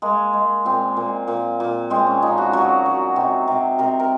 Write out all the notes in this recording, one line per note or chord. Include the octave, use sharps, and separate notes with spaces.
G#3 A#3
G#3
A#2 C4
A#2
A#2
A#2
G#3 C4
C#4
F3 D#4
F#4
F#3 F#4
F#3
C3
C3
C3 A#4
A#4